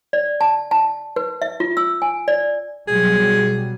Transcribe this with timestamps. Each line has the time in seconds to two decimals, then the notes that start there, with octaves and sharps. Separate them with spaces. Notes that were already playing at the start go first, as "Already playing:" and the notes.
0.13 D5
0.41 A5
0.71 A5
1.16 B4
1.42 E5
1.60 F4
1.77 E6
2.02 G#5
2.28 D5
2.88 B2 F#3 G3 G#4